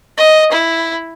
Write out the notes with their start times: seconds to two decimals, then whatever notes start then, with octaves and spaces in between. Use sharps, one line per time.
0.18 D#5
0.52 E4